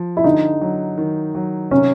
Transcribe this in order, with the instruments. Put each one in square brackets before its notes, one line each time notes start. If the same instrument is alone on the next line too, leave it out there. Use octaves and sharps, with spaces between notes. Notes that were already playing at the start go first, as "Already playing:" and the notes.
Already playing: [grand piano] F3
[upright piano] E4
[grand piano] D3 [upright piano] D#4
[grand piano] F#3
D#3
F#3
[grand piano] C3 [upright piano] C#4